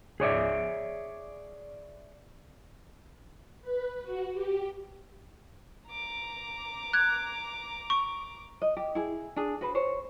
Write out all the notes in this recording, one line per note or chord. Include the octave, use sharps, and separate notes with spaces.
G#4 C#5 D5 E5
B4
F#4
G4
A#5 D6
F#6 G#6
C#6
D#5
G4
E4 G#4
D4 G#4
F#4 B4 C5
C5 C#5